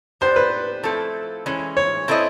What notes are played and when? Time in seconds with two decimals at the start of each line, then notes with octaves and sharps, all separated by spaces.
0.21 B3 D4 G4 C5
0.36 B4
0.83 F3 A3 C4 E4 A4
1.46 E3 G#3 C#4
1.77 C#5
2.08 C4 E4 A4 C5 D#5